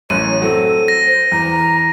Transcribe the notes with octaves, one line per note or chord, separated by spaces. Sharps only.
A1 F#2 C#5 F#6 D#7
F#3 C4 A4
A#6
C5
E2 A#5